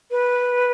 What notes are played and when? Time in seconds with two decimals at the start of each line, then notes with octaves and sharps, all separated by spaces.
0.10 B4